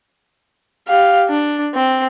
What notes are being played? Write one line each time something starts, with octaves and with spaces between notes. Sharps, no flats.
G4 F5
D4
C4